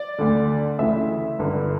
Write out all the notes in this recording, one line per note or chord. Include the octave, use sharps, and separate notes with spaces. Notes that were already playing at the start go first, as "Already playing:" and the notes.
Already playing: D5
D2 D3
D2 C#3 E3 E5
G1 G2 D3